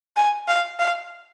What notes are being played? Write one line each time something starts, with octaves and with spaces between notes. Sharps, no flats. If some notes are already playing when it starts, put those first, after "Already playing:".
G#5
F5
F5